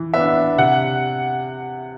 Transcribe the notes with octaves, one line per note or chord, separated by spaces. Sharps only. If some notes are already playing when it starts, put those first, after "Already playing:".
Already playing: E3
B3 E5
D4
C3 F#5